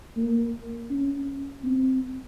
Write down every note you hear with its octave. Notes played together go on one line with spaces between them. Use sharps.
A#3
C#4
C4